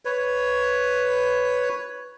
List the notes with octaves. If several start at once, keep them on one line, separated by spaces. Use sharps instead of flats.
B4 C#5